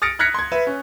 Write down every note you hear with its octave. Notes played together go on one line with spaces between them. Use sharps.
D#6 F6 A6 A#6 C#7 D7
F6 F#6 G#6 A#6 B6 C#7
C6 G#6
B4 E5
C#4